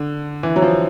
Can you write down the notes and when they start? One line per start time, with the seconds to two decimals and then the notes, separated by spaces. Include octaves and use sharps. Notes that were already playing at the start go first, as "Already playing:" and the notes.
Already playing: D3
0.43 E3
0.56 F#3
0.62 F3